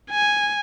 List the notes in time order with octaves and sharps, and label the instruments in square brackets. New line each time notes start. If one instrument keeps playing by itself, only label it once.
[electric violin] G#5